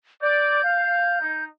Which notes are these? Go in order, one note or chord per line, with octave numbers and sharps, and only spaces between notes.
D5 G6
F5
D#4